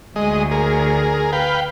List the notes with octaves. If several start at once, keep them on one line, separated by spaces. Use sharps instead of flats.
D2 G#3 D#5
G#4 A#4
B4 F5 G5